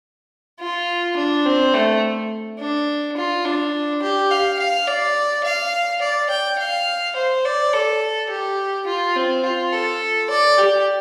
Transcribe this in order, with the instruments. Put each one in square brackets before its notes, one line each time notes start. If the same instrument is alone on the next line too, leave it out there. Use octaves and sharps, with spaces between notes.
[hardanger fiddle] F4
D4
C4
A3
D4
F4
D4
G4
F5
F5
D5
F5
D5
G5
F5
C5
D5
A4
G4
F4
C4
F4
A4
D5
G4